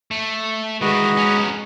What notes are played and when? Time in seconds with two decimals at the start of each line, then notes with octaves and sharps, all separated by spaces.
0.11 A3
0.81 D#3 E3 G#3 F#4 B4 D#5
1.17 C#4 D#4